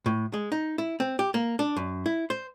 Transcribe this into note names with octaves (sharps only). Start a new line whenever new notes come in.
A2
G#3
D#4
E4
C4
G4
A#3
D4
F#2
E4
C5